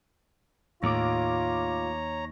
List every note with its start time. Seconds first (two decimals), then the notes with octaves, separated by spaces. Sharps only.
0.83 D#2 A2 F4 C#5 A#5 D6